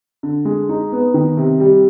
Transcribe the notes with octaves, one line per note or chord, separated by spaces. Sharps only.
D3
G#3
D#4
B3
D#3
C3
G3